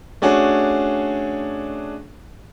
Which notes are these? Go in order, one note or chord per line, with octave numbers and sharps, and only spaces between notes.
A3 C#4 D4 F#4 G#4